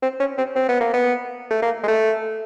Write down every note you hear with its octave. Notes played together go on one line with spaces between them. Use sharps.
C4
C#4
C4
C4
B3
A#3
B3
A3
A#3
G#3
A3